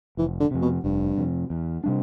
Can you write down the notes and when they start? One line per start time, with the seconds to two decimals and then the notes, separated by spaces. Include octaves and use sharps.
0.17 F1 E3
0.40 D3
0.51 F2 C3
0.62 B2
0.84 F1 G2
1.17 F2 C3
1.50 E2
1.84 C3 G3 D4